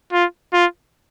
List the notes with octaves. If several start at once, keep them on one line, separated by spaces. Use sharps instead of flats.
F4
F4